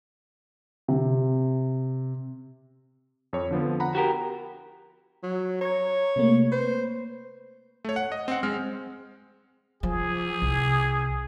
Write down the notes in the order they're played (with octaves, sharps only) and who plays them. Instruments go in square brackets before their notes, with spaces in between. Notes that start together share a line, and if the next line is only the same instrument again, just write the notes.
[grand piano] C3
[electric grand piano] F2 C#5
D3 F3 B3
F#5 A#5 B5
[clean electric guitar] F#4 G4 A#4
[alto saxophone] F#3
[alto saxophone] C#5 [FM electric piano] A#5 C#6 G#6
[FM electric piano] C3 A3 A#3
[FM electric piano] B4 [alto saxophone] C5
[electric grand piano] A3 C#5
F#5
D#5
C4 F#5
G#3 C4 F6
[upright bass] F3 [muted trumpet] G#4
[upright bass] C2